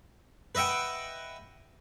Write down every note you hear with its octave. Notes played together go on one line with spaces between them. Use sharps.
B4 D#5 E5 F#5 G5